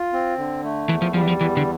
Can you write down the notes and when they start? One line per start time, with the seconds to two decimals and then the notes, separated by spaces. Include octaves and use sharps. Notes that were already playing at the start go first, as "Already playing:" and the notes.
Already playing: F4
0.13 C4
0.38 D3
0.64 A3
0.89 E2 E3
1.02 F3
1.14 F3 G3
1.22 E3
1.27 F3
1.40 E2 E3
1.57 D3